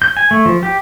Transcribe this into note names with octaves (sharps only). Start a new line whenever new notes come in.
G6
G#5
A3
F3
G4